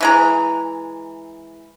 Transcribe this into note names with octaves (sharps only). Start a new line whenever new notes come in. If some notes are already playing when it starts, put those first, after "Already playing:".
E3 G#3 A#5